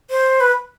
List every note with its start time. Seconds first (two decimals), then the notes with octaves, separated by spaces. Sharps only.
0.10 C5
0.40 B4